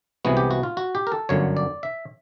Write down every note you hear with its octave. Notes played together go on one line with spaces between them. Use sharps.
C2 C3 E3 G#3 B3 F#4
G4
F#4
F4
F#4
G4
A#4
A4
G1 F#2 D3 F#3 C#5
D5
E5